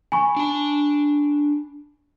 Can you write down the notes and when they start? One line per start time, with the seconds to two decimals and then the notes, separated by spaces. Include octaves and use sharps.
0.12 G#5 B5 C#6
0.36 D4 A5